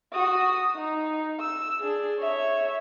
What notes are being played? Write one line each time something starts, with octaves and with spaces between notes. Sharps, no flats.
F#4 D#6
D#4
E6
D4 G#4
C#5 E5